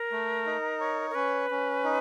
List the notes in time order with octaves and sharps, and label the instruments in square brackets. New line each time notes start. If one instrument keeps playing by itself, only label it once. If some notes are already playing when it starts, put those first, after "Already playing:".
Already playing: [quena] A#4
[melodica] A3
D#4
C#5
[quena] A#4
[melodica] C#4 [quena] B4
[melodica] C#4
D#4